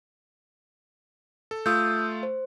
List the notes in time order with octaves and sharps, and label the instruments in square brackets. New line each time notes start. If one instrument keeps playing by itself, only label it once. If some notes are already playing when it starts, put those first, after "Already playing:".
[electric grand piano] A4
[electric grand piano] A3 F4 [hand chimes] D#6 E6 G6
[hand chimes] C5